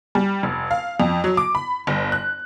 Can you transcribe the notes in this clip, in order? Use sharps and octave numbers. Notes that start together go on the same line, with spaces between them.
G3
F1
F5
F2
F#3
D6
B5
G1
F#6